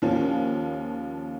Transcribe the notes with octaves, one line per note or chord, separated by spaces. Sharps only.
D#2 F3 C#4